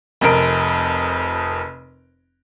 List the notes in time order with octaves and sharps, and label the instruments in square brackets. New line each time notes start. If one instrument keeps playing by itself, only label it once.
[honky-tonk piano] F1 F2 A#4 D7